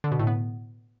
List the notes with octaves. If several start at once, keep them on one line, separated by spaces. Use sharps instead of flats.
D3
B2
A2
B3